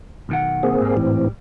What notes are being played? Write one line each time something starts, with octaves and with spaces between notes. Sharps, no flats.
B1 D#3 F#5
A#3 C4 G#4
G#2 G3
A2 E3 C4